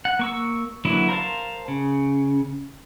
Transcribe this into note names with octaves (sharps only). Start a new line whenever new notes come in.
F#5
A#3 C#6 E6
D3 E3 F#3 A#3 E4
A#4 C5 F5 A5
C#3